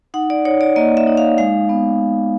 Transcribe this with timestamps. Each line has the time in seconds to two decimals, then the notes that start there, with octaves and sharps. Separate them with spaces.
0.14 D#4 F#5
0.30 D5
0.45 D#4 C#5
0.61 D5
0.76 A#3 D#5
0.97 E5
1.07 D#4
1.17 F5
1.38 G#3 F5
1.69 B3